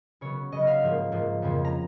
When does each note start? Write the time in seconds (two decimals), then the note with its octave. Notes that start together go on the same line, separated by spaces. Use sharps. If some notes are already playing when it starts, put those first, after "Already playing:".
0.21 C#3 F#3 B3 C#5
0.52 C#3 F#3 B3 D#5
0.67 F5
0.82 G#2 F3 A#3
1.12 G#2 F3 A#3
1.42 F2 C#3 F3 A#3
1.65 A#5